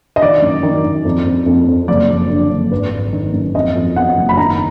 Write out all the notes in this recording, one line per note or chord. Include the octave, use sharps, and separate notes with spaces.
D#5
D#3 D5
F#2
D#3
D#3
F2
F2
F2
F2
F#1 D5
F3
D3
F#1
G#1 B4
G#1
D#3
F#2
F2 D#5
F2
B3 F#5
F#1
B5
D#3 A#5